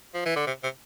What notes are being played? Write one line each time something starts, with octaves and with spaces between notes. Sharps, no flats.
F3
E3
D3
C3
C3